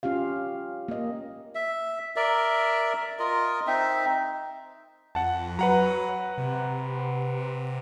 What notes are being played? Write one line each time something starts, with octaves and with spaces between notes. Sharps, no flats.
C#4 F4 G4 F5
A#3 D#5
E5
A#4 D5 E5
F4 A#4 D#5
C4 D#4 E5
F2 F#5 A5
F#3 B4 F#5 A#5
C3